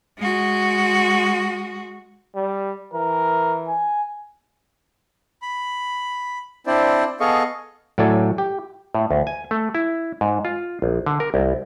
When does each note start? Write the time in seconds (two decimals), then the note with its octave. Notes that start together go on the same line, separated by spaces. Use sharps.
0.19 G#3 F#4
2.35 G3
2.94 E3 A#4
3.68 G#5
5.42 B5
6.67 C4 D4 E4 C5 D5
7.20 B3 G#4 A4 D#5 F5 C#6
7.98 A2 F#3 A3 A4 D5 G#5
8.38 G4
8.95 A2
9.11 D2
9.27 G#5
9.51 A3
9.75 E4
10.21 G#2
10.45 F4
10.82 A#1
11.06 D3
11.20 A#4
11.34 C2